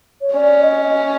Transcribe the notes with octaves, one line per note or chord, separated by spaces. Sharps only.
C#5
C#4 D5
D#5
D#5